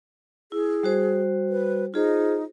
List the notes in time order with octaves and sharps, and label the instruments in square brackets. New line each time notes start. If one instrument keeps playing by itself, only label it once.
[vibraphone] E4 [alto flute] G#4
[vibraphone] G3 F#4 C5
[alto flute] B4
[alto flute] D#4 [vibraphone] F4 G#4 C5